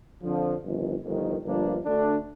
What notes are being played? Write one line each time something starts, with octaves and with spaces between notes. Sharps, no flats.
F2 D3 F3
G1 F2 D#3
G1 F2 D#3
G1 G2 F3 A#3 D4
D2 D3 A3 D4